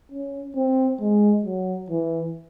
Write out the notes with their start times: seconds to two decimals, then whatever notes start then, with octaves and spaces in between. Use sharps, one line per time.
0.12 C#4
0.56 C4
1.01 G#3
1.45 F#3
1.90 E3